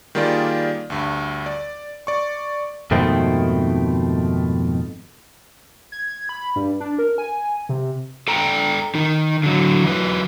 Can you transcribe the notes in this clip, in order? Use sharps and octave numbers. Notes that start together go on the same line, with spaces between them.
D#3 G3 A#3 F4 G#4 D5
D2 G2
D5
D5 C#6
F2 G#2 B2 D#3 A3 C4
G#6
B5
G2
D4
A#4
G#5
C3
A4 G5 A#5
D#3 D#4
D3 F#3
E3 F#3 B4